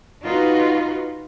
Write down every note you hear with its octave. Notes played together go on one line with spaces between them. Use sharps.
D#4 F4 F#4 B4